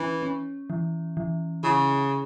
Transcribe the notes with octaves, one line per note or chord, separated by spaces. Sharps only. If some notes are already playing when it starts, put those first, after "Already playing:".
Already playing: E3 C#4
C#4
E3
E3
C#3 E4